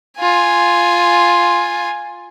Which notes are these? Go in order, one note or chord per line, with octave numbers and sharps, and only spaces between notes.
F4 G#5